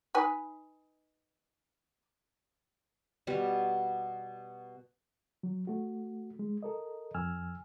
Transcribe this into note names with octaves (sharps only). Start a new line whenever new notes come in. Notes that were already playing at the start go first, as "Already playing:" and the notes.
D#4 B4 G#5
B2 G3 F#4
F#3
A3 F#4
G#3
A4 A#4 D#5
F2 G#5 E6 F6